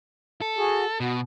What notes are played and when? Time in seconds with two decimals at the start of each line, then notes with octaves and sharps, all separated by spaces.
0.41 A4
0.57 F#4 G#4
1.00 B2 F#4